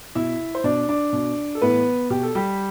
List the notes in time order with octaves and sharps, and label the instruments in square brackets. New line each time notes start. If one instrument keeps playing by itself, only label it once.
[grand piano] B2 E4 E5
C5
B2 D4 D5
D4 D5
B2
A4
A2 E3 B3 B4
B2 G4
A4
G3 G4